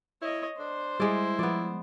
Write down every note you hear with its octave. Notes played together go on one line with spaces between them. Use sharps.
E4 C#5 D#5
D4 C5
G3 G#3 E4 D5
F3 B3 D5